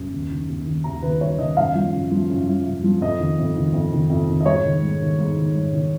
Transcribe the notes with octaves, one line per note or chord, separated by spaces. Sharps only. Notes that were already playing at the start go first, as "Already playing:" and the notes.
Already playing: F#2
D#2
D#3
D#2
D#3
D#2 A#5
D#3 B4
D#2 C#5
D#3 D#5
F#2 F5
F3
F#2
F3
F#2
F3
F#2
F3
F2 D#5
D#3
F2
D#3
F2
D#3
F2
D#3
D#5
G#2 C#5
D#3
G#2
D#3
G#2
D#3
G#2
D#3